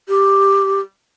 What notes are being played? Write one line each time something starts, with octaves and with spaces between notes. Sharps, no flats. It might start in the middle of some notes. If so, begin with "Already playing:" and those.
G4